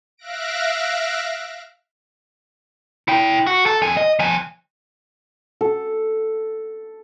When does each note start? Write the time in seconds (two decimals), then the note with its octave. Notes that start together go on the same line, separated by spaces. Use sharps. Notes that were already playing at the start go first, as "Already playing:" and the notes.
0.17 E5 F5 F#6 A#6 D7
3.08 E4 G5
3.47 F#4
3.66 A4
3.82 F2 G#5
3.97 D#5
4.19 F3 G#5
5.61 A4